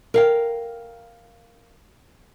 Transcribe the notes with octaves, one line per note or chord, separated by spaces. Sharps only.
A#4 F5 G5